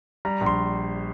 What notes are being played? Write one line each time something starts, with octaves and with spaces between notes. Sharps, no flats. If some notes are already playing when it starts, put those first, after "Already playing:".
G3 A#5
A#1
C6